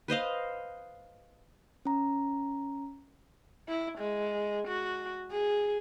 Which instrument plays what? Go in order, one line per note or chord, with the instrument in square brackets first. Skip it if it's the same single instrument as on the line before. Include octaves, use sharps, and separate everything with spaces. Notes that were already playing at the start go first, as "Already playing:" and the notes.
[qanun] B4 C5 D#5 F5
[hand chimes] C#4 A#5
[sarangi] E4
G#3
F#4
G#4